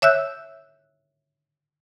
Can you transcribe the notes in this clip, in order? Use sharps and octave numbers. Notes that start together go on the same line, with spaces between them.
C#5 E5 E6 F#6 G6